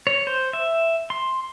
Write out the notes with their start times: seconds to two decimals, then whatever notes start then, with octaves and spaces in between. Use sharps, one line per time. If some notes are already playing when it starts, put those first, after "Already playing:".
0.07 C#5
0.27 C5
0.53 E5
1.10 C6